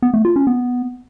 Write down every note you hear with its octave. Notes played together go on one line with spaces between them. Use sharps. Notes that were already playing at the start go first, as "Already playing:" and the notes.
B3
A3
F4
C#4
B3